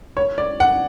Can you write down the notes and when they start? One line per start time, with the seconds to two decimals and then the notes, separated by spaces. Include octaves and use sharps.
0.17 C#5
0.38 D5
0.60 F#5